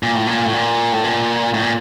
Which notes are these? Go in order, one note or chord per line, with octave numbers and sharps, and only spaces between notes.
A#2
A2
A#2
A2
A#2
A2
A#2
A2
A#2